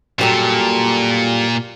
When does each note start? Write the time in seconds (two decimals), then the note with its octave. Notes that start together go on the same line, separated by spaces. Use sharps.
0.19 F#2 A#2 G3 A4